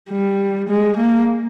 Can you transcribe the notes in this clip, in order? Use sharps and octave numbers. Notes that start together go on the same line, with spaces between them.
G3
G#3
A#3